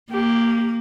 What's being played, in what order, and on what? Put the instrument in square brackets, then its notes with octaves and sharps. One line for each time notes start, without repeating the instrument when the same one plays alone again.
[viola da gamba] A#3 [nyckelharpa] G4